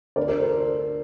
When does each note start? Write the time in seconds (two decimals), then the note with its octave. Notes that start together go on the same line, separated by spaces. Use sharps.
0.16 D2 A#4 D5
0.28 A#4 D5
0.40 A4 C5